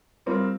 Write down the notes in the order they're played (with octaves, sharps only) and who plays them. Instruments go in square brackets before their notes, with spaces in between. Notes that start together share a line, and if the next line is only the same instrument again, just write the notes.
[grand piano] G3 C4 F4 A#4